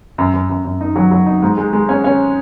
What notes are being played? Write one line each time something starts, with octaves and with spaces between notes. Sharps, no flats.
F#2
F#2
F#2
F#2
D#4
F#3
F#3
D#4
G#2
G#3
G#3
C#4
C#4